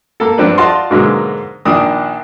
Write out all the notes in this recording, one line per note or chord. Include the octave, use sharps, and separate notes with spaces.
A#3 A4
G2 F3 C4 D4 B4
F4 F#4 D5 D#5 A5 C6
G#2 B2 D3 F#3 G#3 A#3
A#1 A#2 D#3 D4 D#6